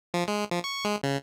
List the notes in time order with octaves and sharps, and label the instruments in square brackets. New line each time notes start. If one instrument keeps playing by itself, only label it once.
[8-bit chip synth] F3
G#3
F3
C#6
G#3
C#3